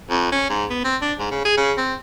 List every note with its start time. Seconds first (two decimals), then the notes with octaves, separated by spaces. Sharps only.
0.10 F2
0.32 C#4
0.50 G#2
0.70 B3
0.84 C4
1.02 D4
1.19 G#2
1.31 C#3
1.45 G#4
1.57 C#3
1.77 C4